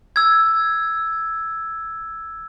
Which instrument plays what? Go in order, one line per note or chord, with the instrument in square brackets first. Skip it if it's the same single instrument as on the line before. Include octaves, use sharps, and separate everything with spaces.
[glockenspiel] E6 G#6